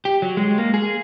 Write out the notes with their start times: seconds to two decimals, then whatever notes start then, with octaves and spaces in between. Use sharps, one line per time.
0.05 G4
0.22 F#3
0.37 G#3
0.58 A#3
0.74 G#4